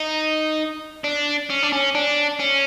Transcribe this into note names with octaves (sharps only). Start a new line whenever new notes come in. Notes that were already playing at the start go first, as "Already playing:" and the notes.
Already playing: D#4
D4
C#4
D4
C#4
D4
C#4